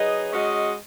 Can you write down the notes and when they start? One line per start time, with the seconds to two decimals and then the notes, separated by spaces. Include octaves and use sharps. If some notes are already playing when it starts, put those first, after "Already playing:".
Already playing: F#3 D#4 G#4 B4 D#5
0.32 G#3 C#4 F#4 D#5